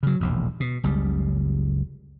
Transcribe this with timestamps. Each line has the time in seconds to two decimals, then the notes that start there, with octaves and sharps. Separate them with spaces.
0.03 C#3 F#3
0.20 E1 A#1 D#2
0.60 B2
0.83 F#1 C#2 C#3 G3